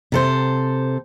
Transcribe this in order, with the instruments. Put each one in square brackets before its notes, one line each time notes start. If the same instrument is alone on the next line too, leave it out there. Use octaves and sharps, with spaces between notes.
[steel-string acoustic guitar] C3 A4 C5